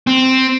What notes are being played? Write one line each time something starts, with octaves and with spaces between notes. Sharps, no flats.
C4